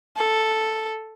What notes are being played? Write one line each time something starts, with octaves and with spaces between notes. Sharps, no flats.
A4